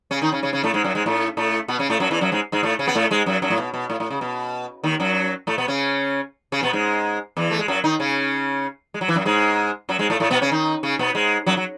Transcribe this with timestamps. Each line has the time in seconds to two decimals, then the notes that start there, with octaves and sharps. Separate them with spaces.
0.11 C#3 C#4
0.22 D#3 D#4
0.32 C#3 C#4
0.43 C#3 C#4
0.53 C#3 C#4
0.64 A2 A3
0.74 G#2 G#3
0.84 F#2 F#3
0.95 G#2 G#3
1.06 A2 A3
1.37 A2 A3
1.68 B2 B3
1.79 C#3 C#4
1.90 A2 A3
2.00 F#2 F#3
2.11 E2 E3
2.21 F#2 F#3
2.32 G#2 G#3
2.52 G#2 G#3
2.63 A2 A3
2.79 C#3 C#4
2.88 B3
2.95 A2 A3
3.11 G#2 G#3
3.26 F#2 F#3
3.42 F#2 F#3
3.50 A2
3.58 B2
3.74 B2
3.90 A2
4.00 A2
4.10 C#3
4.21 B2
4.84 D#2 D#3
5.00 F#2 F#3
5.47 A2 A3
5.58 B2 B3
5.68 C#3 C#4
6.52 C#3 C#4
6.63 B2 B3
6.73 G#2 G#3
7.37 E2 E3
7.51 A3
7.59 G#3
7.68 F#2 F#3
7.84 D#3 D#4
8.00 C#3 C#4
8.94 G#3
9.01 F#3
9.08 E3
9.16 F#2 F#3
9.25 G#2 G#3
9.89 F#2 F#3
9.99 G#2 G#3
10.10 A2 A3
10.20 A2 A3
10.31 B2 B3
10.42 C#3 C#4
10.52 D#3 D#4
10.83 C#3 C#4
10.99 B2 B3
11.15 G#2 G#3
11.46 F#2 F#3
11.57 F#3